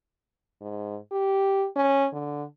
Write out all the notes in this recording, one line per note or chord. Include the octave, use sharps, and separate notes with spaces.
G#2
G4
C#4
D3